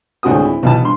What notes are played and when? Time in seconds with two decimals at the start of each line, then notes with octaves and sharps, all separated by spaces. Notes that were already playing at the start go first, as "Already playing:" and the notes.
0.23 G#1 D2 A2 C4 F#4 D#6
0.44 E4
0.63 B1 B2 E3 A5
0.81 G2 C6